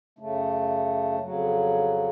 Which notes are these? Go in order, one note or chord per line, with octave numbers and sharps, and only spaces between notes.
F#2 C#3 A3
F2 C#3 F#3